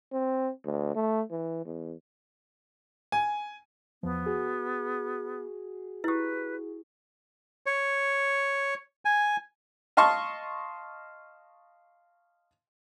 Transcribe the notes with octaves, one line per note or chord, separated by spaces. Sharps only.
C4
D2
A3
E3
E2
G#5
E2 F3 B3
F#4 G#4
E4 G4 B4
C#5
G#5
D#5 F5 A5 C6 C#6